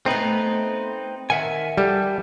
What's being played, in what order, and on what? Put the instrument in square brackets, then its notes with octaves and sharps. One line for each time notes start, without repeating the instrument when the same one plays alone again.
[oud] A3 B3 [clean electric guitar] C4 D#4 B4
[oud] D#3 [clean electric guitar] E5 F#5 G#5
[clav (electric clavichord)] G3 [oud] A4